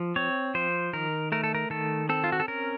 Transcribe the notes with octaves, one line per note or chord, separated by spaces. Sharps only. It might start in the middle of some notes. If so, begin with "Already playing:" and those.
Already playing: F3
C4 C#5
F3 C5
D#3 A#4
A3 A#4
A4
A#4
D#3 A4
C4 A4
F4
F#4
A4
C#4 A#4